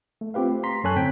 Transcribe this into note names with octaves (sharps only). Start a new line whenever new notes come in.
A3
C4 F4 G4 B4 F5
A3
A#5 C6 B6
F#2 A4 C#5 G#5 A5 F#6
A2 D3 C4 G5 B6